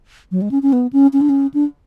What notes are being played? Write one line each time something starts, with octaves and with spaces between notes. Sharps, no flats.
F#3
G#3
C#4
C#4
B3
C#4
C#4
D4
C#4
D4